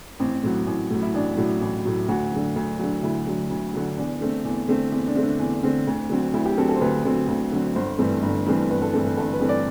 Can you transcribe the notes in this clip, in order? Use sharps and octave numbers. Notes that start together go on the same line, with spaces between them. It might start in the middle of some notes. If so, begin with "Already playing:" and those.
A1 C4
A2 F#3
A1
A2 F#3
E4
A1 D4
A2 F#3
A1
A2 F#3
D2 F#4
D3 F#3
D2
D3 F#3
D2 E4
D3 F#3
D2
D3 F#3
E2 D4
D3 A3 C4
E2
D3 A3 C4
E2 C4
D4
D3 A3 C4
D4
E2
D3 A3 C4
D2
D3 F#3 C4
D2 E4
G4
D3 F#3 C4 A4
A4
C5
D2 B4
D3 F#3 C4
D2
D3 F#3 C4
G1 C5
G2 E3 A3 C4
G1
G2 E3 A3 C4
G1 B4
A4
G2 E3 A3 C4 A4
B4
G1 A4
B4
G2 E3 A3 C4
D5